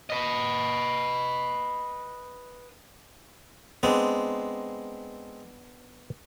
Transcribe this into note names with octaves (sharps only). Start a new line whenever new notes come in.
B4 D#5
G#3 B3 C4 D4